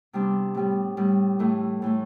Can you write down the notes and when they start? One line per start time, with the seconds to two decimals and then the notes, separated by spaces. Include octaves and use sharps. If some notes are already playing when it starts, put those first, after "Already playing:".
0.13 C3 G3 B3 D4
0.54 A2 G3 B3
0.97 A2 G3 B3
1.39 A2 E3 A3
1.82 A2 E3 A3